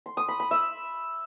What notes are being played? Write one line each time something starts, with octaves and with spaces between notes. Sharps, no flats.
C6
D#6
B5
B5
E5